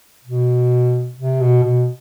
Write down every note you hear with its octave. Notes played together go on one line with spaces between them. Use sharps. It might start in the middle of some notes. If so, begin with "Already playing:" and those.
B2
C3
B2
B2